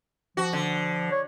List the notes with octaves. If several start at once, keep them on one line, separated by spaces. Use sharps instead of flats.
F3 F#4
D3
C#5